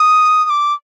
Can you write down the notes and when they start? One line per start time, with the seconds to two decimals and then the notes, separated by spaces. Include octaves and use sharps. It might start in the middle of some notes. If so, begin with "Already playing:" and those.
Already playing: D#6
0.45 D#6
0.50 D6